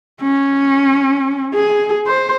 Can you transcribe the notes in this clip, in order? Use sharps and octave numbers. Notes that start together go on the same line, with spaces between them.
C#4
G#4
C5